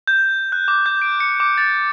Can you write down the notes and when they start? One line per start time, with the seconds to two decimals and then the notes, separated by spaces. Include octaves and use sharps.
0.07 G6
0.52 F#6
0.68 D6
0.86 G6
1.02 D7
1.20 C#7
1.40 D6
1.58 A6